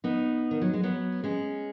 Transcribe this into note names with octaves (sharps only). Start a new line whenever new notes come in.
B3 D#4
D#3
F#3
G#3
F#3 B3
G#3 C#4